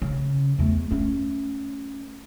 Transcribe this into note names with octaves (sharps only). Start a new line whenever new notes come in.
C#3
E2 A3
A3 C#4